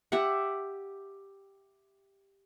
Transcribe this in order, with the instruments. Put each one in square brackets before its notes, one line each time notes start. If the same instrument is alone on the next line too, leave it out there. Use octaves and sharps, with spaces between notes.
[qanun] G4 E5 F#5